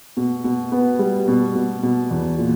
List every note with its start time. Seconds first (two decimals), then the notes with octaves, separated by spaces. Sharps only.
0.17 B2
0.44 B2
0.72 B3
0.99 G3
1.28 B2
1.55 B2
1.83 B2
2.11 E2
2.38 A#2